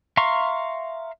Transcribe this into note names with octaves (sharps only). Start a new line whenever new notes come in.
E5 F5 A#5 C6 C#6